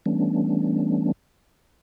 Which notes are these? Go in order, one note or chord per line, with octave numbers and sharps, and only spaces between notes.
E3 G3 A3 B3 C#4 D4